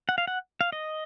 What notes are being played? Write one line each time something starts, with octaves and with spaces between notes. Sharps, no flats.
F#5
F5
F#5
F5
D#5